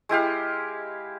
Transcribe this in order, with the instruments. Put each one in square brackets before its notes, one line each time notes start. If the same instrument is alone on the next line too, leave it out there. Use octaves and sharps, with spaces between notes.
[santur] G#3 E4 G4 F5